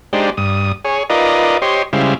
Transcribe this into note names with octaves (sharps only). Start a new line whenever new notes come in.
G#3 D4 D#4 G4 C5
G2 D#6
G#4 C#5
D#4 F4 A#4 B4 D5 D#5
G4 C5 C#5 D#5 C6
C#3 G3 G#3 E4 C5 F5